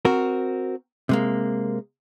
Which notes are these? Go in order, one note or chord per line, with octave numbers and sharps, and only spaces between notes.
C4 F#4 A#4
C3 G#3 A#3